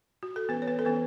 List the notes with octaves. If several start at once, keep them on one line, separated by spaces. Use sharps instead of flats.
F#4
A4
E3 B3 C#4 B4
C#5
B3 B4
A4
E3 B3 C#4 B4